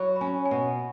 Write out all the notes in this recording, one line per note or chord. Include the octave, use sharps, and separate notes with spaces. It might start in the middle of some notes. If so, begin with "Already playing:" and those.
Already playing: F#3 B5 C#6
B5
C#4 G#5
G#5
B2 F#5